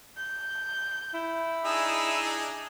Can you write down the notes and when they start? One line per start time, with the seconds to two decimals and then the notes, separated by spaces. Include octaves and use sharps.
0.17 G6
1.14 E4
1.65 D4 D#4 G#4 E6